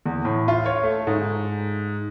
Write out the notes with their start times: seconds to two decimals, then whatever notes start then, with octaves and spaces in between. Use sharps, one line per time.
0.06 E2
0.25 A2
0.48 F4
0.66 C#5
0.83 A3
1.07 G#2